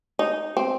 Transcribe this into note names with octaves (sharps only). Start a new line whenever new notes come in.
D#4
C4